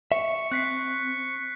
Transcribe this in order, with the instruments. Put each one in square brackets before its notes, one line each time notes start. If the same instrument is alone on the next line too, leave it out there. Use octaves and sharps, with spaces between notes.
[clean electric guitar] E5 [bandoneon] C#6
[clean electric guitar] C4 [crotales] F#6 B6 C7